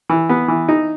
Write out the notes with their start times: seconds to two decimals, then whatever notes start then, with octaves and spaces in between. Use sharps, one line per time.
0.09 E3
0.29 B3
0.48 E3
0.68 D#4